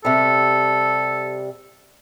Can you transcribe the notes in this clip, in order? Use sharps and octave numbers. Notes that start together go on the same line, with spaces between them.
C3 G3 A4